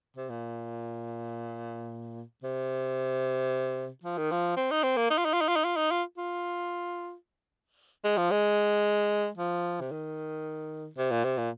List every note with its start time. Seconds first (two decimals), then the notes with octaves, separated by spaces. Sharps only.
0.17 C3
0.30 A#2
2.44 C3
4.04 F3
4.18 D#3
4.32 F3
4.57 C4
4.71 D#4
4.83 C4
4.97 A#3
5.11 D#4
5.18 F4
5.25 D#4
5.33 F4
5.41 D#4
5.48 F4
5.56 D#4
5.65 F4
5.77 D#4
5.91 F4
6.18 F4
8.04 G#3
8.18 F3
8.31 G#3
9.38 F3
9.81 C3
9.92 D#3
10.98 C3
11.11 A#2
11.24 C3
11.38 A#2